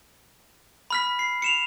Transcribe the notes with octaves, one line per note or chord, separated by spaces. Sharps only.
B5 F6 B6
C7
C#7 E7 F7